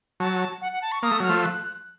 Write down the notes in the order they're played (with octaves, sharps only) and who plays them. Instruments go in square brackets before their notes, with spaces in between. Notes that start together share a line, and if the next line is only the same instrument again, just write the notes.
[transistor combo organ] F#3 [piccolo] A5
[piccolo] F#5
F#5
A5
C#6
[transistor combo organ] A#3 [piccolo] D#6
[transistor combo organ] A3
[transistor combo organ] F#3 [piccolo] F6
[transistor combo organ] F3 A3
[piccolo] F#6